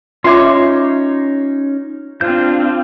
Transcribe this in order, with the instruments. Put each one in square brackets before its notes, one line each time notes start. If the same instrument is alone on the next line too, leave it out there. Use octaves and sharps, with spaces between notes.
[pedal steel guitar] C#4 D#4 [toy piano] F4 E5 D6 [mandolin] C#5 C6
[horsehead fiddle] C4 F4 [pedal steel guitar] D4 C5 G6